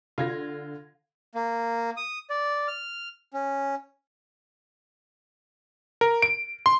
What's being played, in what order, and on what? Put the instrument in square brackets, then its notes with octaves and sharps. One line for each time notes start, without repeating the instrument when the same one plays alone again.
[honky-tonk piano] D3 G#6 A#6 [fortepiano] F4
[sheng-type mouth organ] A#3
D#6
D5
F6
C#4
[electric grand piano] A#4
D7
C6